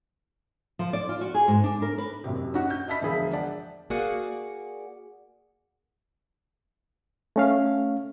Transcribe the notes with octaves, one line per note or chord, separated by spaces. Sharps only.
F3
D5
F4
F#4
G#4
G#2
D4
A#4
B4
F#1 F#2 C3 G4
C#4 D#4 F#4 F#5
G6
D#5 E5 A5 B5 B6
E1 D3 F3 G#4 E5 B5
D5 F#5 A5
A#3 F#4 G#4 D5 F#5
A3 C#4 F5